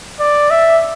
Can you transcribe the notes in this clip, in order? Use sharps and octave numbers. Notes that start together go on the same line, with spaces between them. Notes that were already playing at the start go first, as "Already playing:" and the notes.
D5
E5